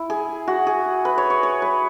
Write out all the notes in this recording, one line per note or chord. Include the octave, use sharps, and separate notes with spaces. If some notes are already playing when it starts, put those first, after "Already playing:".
Already playing: E4
G#4
F#4
G#4
B4
C#5
C#5
C#5
B4